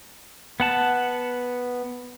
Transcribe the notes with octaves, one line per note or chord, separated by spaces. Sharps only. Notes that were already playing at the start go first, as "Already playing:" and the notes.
B3 F#5 A5